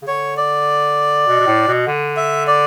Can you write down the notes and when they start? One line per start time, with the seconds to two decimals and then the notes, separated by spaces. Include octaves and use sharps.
0.02 C#3
0.07 D3 C#5
0.37 D5
1.27 B2
1.40 B2
1.47 A2
1.67 B2
1.87 D3
2.17 E5
2.47 D5